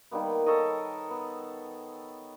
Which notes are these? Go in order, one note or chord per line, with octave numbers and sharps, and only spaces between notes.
D#3 G3 A#3 B3
A4 A#4 C#5 D#5
B3